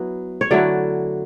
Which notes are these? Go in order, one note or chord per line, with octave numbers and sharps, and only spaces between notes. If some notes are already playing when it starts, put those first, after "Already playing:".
Already playing: F#3 B3 E4
C#5
D3 F#3 A3 E4 D5